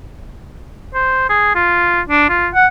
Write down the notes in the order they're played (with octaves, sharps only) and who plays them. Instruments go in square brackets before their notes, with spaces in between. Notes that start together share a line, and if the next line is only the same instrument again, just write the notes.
[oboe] C5
G#4
F4
D4
F4
F#5